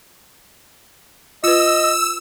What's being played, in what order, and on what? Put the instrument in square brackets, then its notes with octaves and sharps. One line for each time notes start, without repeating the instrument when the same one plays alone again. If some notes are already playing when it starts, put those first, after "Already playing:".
[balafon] F4 B4 [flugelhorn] D#5 [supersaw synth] E6